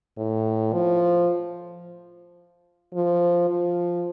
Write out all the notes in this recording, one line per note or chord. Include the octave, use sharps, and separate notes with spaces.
A2
F3
F3
F3